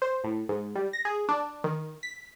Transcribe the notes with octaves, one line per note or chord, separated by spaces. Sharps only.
C5
A2
G#2
G3
A#6
G#4
D4
D#3
B6